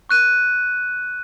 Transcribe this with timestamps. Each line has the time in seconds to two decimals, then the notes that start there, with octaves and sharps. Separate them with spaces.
0.09 C#6 F#6 D#7